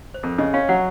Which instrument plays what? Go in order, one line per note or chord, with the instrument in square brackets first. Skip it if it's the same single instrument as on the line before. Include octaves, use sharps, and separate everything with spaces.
[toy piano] C5
[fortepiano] F2 [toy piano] A#4
[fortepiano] C#3 [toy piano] D#5
[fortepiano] C#4 [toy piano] F5
[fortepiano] F#3 [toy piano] F#5